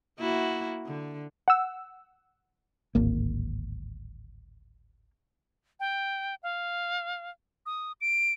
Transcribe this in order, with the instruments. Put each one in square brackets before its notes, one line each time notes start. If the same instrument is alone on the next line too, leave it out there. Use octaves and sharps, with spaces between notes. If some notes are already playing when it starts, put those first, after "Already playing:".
[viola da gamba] A#3 E4 F#4
D3
[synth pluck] F#5 E6
[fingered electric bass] D1 G#1 A#3
[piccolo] G5
F5
D#6
D7